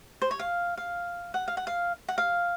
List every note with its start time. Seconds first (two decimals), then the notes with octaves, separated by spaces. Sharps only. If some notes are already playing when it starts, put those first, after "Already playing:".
0.22 C5
0.31 C#5
0.39 F5
0.77 F5
1.34 F#5
1.48 F5
1.57 F#5
1.67 F5
2.08 F#5
2.18 F5